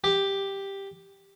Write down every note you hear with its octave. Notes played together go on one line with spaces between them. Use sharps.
G4